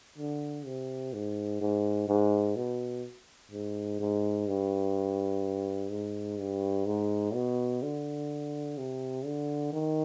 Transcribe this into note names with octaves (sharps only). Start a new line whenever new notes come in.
D3
C3
G#2
G#2
G#2
B2
G#2
G#2
G2
G#2
G2
G#2
B2
D3
C3
D3
D#3